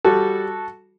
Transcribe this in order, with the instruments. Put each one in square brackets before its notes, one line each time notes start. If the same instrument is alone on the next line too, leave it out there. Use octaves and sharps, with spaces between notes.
[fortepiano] G3 F#4 A4